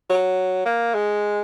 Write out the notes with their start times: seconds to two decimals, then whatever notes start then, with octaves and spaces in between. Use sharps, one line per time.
0.10 F#3
0.66 A#3
0.95 G#3